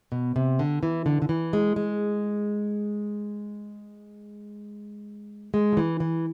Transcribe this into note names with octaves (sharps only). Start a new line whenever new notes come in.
B2
C3
D3
E3
D3
D3
E3
G#3
G#3
G#3
F3
E3
E3